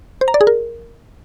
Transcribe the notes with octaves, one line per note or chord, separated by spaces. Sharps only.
C5
A#5
D5
G#4
A#4